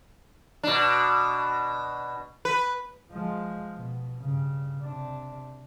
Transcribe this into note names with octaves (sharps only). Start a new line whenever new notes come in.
B2 D4
B4
F3 G#3
B2
G2 C#3
C3 D4